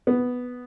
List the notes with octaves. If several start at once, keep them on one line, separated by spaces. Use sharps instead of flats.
B3